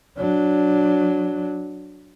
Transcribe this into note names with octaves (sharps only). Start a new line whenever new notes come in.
F#3 D4